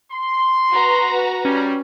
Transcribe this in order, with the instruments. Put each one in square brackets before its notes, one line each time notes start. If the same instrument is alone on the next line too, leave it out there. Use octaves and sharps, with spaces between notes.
[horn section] C6
[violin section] F#4 B4 A#5
[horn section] G3 [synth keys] C#4